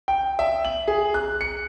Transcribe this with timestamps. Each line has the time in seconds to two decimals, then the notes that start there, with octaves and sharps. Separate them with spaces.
0.08 G5
0.39 E5
0.65 F#7
0.88 G#4
1.14 F#6
1.41 C#7